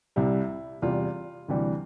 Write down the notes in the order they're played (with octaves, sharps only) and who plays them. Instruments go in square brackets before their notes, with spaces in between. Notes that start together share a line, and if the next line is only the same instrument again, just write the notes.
[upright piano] C2 C3 G3 E4
E2 C3 G3 F4
D2 C3 E3 G3